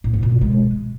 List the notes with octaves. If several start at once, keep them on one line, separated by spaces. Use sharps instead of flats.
A2
C#4
A#2
B2
G#3